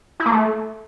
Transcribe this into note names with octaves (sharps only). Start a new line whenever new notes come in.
E4
A#3
A3